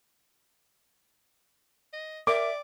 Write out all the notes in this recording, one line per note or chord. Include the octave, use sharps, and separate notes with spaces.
D#5
A#4 D5 E5 D6